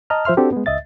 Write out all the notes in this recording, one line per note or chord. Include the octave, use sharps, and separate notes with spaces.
D#5 A5 A#5 F6
F3 C5 E5 C6 F6
C4 D4 F#4 G4 A4
G#3 B3
C#2 D#5 E5 A6